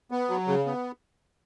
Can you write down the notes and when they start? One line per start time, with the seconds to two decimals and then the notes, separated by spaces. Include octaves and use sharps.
0.11 B3
0.29 F#3
0.47 C#3
0.66 B3